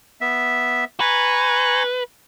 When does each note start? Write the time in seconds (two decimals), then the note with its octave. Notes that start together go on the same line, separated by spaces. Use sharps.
0.21 B3 E5
1.00 B4 G#5 A#5 C#6